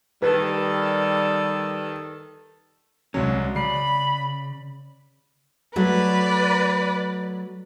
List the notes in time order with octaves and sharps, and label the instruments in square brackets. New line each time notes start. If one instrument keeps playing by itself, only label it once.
[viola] D#3 A4 [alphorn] G3 [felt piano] B4
[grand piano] C2 F#3 [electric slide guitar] G#3 C#4
[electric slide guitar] C#3 [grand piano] D5 C7 [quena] B5
[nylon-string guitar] F#3 A3 [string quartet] B4 D5